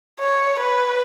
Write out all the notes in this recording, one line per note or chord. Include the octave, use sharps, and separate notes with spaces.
C#5
B4